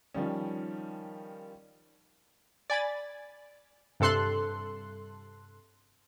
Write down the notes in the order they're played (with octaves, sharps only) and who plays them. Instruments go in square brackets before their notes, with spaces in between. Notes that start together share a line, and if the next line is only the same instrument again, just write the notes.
[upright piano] D#3 F3 G3 C#4
[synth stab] D5 G#5 B5 A6
G2 C3 A4 C6 F#6